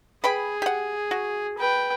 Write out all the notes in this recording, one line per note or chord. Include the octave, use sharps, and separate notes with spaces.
G#4 B4 G5 B5
G4 F#5
F#4
B4 G5